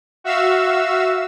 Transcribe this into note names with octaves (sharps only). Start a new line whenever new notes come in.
F#4 E5 F5 E6